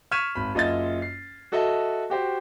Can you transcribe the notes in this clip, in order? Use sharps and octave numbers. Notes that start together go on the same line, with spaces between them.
C#6 F6 G#6 B6 D#7 E7
G#1 B5
F#1 F4 D#5 E5 A6
C7
F#4 A4 D#5 E5 A5
F#4 G4 C5